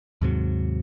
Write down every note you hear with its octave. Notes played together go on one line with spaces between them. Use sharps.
D#2 G#2 C3 F#3